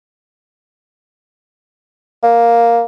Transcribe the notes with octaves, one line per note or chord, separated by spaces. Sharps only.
A#3